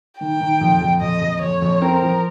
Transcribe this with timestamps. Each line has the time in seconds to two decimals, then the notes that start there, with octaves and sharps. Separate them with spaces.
0.20 D#3 G5
0.41 D#3
0.61 F2
0.82 F2
1.01 F2 D#5
1.21 F2
1.42 F2 C#5
1.62 F2
1.82 C4 A#4
2.03 F3